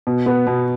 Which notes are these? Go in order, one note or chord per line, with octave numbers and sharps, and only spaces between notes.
B2
B3
B2